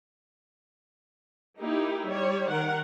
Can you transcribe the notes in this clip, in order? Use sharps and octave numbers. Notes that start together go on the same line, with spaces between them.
A#3 D#4 E4 G4
G3 C#5
D#3 A#4 F#5